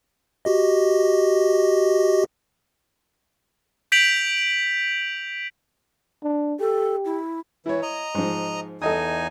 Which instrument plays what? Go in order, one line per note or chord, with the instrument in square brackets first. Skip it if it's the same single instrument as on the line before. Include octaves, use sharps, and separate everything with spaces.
[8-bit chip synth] F#4 G4 D#5
[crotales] G6 B6 D7 F7 F#7
[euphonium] D4
[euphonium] G4 [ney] A4
[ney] E4
[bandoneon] E3 [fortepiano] E4 C#5
[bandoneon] D#5 A#5
[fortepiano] G#2 F3
[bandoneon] E2 D#4 G#5 [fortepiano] A4 D#5 D#6